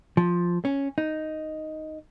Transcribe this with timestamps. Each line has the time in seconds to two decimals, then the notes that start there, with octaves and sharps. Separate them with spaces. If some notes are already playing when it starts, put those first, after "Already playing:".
0.17 F3
0.65 C#4
0.98 D#4